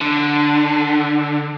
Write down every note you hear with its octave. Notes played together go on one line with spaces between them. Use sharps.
D3